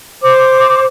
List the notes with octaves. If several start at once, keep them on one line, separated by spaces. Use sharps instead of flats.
C5 D6